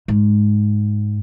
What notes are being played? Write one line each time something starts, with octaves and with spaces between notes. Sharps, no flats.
G#2